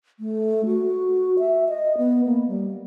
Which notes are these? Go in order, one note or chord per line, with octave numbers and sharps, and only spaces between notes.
A3
F#4
E5
D#5
B3
A#3
G3